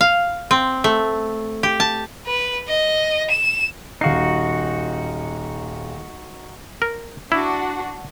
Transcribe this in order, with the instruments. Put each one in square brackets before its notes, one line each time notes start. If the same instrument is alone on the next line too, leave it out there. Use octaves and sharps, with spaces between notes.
[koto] F5
C4
A3
G4
A5
[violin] B4
D#5
E7
[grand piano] D#1 F5 C7 [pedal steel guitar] D#4 F#4
[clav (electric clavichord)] A#4
[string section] D4 F#4 [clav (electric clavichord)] E4